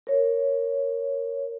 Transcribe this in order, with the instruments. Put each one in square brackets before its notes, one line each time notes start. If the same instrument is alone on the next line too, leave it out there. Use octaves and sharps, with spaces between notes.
[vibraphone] A#4 C#5